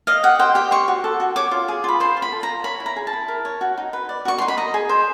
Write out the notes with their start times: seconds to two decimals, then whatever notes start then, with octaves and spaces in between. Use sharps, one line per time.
0.07 D#5 F5
0.23 G4 F#5
0.39 C5 G5
0.55 G4 G5
0.71 C5 C#6
0.88 F#4
1.04 A4
1.20 F#4
1.36 C#5 D6
1.51 F4
1.68 G#4
1.84 F4 B5
2.00 C5 C6
2.17 F4
2.22 B5
2.32 A4
2.43 A#5
2.49 F4
2.64 C#5 B5
2.80 E4
2.86 A#5
2.96 G#4
3.07 A5
3.13 E4
3.28 A#4
3.45 C#5
3.61 F#4
3.78 D#4
3.93 B4
4.09 D5
4.25 F#4 C#6
4.38 D#4 C6
4.48 B5
4.57 D#5 A#5
4.74 G#4
4.89 C5